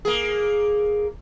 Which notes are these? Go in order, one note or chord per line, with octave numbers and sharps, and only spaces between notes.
A#3 G#4